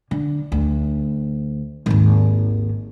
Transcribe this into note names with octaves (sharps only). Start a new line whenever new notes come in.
D3
D2
G#1 D#2